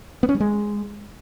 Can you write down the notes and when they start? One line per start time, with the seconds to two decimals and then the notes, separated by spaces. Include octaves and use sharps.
0.23 B3
0.29 C#4
0.35 G3
0.40 G#3